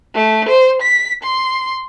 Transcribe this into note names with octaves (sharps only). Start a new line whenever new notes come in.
A3
C5
B6
C6